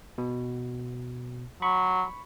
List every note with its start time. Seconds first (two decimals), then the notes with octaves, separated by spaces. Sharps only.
0.18 B2
1.62 F#3 B5 C#6